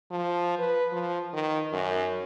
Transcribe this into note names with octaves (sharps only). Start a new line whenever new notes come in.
F3
B4
F3
D#3
F#2